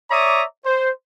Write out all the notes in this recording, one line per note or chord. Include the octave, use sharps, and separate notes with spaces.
C#5 D5 E5 A#5 D6 D#6
C5